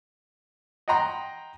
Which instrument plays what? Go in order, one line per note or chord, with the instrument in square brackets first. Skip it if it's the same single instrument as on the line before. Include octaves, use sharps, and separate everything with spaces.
[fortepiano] D#5 F#5 G5 A#5 C6